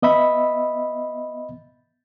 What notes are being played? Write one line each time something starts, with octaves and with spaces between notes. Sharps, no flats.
B3 D#5 E5 B5